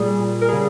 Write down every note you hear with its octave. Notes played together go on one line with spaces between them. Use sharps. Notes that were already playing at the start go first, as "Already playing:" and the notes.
Already playing: A#2 G3 G#4
A#2 G3
A#4
C#3 G3 G#4